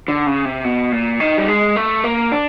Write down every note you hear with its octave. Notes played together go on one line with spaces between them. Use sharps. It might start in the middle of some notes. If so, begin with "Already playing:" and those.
D3
C#3
C3
B2
A#2
D#3
G3
G#3
A3
A#3
D4